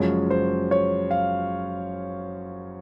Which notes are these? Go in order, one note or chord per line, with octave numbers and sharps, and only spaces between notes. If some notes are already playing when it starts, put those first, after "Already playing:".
Already playing: F#1 F#2 F3 G#3 C#4
C5
C#5
F5